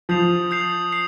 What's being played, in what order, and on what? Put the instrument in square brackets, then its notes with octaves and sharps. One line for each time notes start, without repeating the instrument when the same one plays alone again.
[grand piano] F3 [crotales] D#6 G6 C7 F7
[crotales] D#6 G6 C7 F7
C7